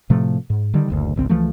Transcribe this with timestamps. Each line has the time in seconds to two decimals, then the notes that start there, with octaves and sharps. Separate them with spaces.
0.10 A2 C3 F3 A3
0.50 G#2
0.74 D3 D#3 G3
0.90 F#1 D2
1.16 G#1 C#2 C4
1.29 C#2 E3 F3 A3